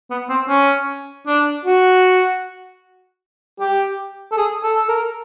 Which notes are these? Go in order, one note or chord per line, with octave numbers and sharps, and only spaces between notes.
B3
C4
C#4
D4
F#4
G4
A4
G#4
A4
A4
A#4